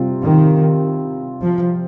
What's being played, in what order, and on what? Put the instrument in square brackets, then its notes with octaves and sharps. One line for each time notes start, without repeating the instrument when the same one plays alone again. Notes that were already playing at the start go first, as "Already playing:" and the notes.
Already playing: [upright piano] C3 G3 C4 F4
[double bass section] D#3
F3